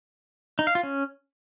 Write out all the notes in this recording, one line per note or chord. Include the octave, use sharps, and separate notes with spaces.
D#4
F5
F4
C#4